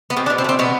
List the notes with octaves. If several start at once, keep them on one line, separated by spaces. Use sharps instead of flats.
B3
B2 C4
D4
B2
C4
A3
C4
B2 B3